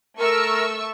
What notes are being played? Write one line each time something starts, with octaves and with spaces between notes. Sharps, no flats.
A3 A#4 C#6 E6